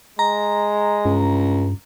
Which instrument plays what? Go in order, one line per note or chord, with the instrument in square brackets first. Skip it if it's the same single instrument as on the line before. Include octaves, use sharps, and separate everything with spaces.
[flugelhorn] G#3 [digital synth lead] A#5
[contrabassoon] C#2 [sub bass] G2